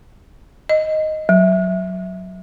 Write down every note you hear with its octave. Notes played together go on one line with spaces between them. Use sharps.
D#5
F#3